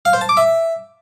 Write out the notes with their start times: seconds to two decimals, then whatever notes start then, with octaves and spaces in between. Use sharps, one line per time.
0.05 F5
0.13 C5
0.21 A5
0.29 D6
0.37 E5